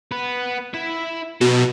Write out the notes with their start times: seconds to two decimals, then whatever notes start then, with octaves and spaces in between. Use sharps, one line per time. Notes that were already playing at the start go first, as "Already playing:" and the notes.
0.11 B3 B4
0.74 E4 E5
1.41 B2 D#4 A4